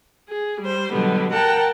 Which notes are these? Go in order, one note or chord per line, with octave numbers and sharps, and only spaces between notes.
G#4
G3 C5
B2 D3 F#3 G3 B3
A#4 F#5 G5 A5